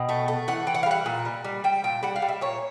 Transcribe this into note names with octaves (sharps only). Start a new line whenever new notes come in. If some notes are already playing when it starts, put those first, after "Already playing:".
Already playing: B2 G5
A3
A3
E3 F#5
E3 G5
F#5
F5
G3 F#5
A#2
G3
G3
G3 G5
A#2 G5
G3 F#5
F5
G3
E5
A#2 C#5